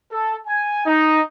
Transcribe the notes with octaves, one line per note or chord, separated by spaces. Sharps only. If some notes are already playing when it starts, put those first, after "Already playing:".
A4
G#5
D#4